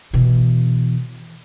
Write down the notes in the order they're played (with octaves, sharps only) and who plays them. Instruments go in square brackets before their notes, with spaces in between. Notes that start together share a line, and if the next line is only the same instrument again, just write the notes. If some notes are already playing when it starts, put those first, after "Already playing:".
[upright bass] B2 E3